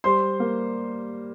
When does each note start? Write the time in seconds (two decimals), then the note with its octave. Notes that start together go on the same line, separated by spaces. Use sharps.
0.04 G3 C5 C6
0.40 A#3